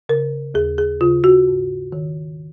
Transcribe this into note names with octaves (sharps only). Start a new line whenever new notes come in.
C#3 A#4
D#2 G#4
G#4
C#3 F4
F#4
G#2
D#3